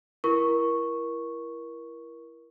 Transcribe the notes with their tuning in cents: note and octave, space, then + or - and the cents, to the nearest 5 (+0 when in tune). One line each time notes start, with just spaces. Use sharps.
E4 +25 A#4 +25 C#6 -5